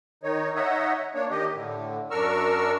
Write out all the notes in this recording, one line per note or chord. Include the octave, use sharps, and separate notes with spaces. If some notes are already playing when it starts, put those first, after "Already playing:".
D#3 D#4 C#5
D#4 C#5 D#5 E5 F#5
A#3 D4 C#5
D#3 G4 D#5
A2 D3
F#2 D4 A#4 C#6 E6 F6